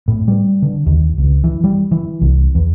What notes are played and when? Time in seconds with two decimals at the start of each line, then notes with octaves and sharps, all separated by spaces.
0.08 A2
0.28 G3
0.62 D3
0.86 D#2
1.18 C#2
1.44 E3
1.64 G3
1.91 E3
2.21 C2
2.55 E2